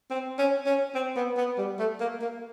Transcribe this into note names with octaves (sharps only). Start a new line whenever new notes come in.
C4
C#4
C#4
C4
B3
B3
G3
A3
A#3
A#3